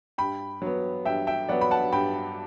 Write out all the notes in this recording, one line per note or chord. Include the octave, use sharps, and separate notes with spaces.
G2 G5 B5
F#3 B3
G2 E5 G5
E5 G5
F#3 B3 D5 F#5
B5
F#5 A5
G2 G5 B5